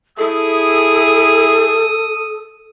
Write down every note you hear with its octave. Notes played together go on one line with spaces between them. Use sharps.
E4 G#4 A4 D#6